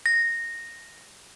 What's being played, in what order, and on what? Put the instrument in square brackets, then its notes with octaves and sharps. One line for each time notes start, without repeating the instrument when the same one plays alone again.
[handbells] A#6